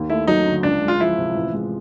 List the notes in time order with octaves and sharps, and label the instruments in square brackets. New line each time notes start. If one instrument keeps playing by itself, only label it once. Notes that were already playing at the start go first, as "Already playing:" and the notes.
Already playing: [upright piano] D#2
[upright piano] A3 [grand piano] E4
[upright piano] F#3 [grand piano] D#4
[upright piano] D3
[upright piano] C#2 [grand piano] D4
[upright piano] G#3
[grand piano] F4
[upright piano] F3 [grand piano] E4
[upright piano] C3
A1
G#3